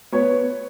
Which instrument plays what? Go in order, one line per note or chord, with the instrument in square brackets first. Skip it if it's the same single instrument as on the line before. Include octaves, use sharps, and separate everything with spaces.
[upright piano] B3 C#5